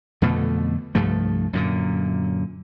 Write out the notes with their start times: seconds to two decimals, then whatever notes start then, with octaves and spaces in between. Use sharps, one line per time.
0.22 F2 B2 D3 A3
0.95 C2 G2 F3 A3
1.53 F#2 A#2 D3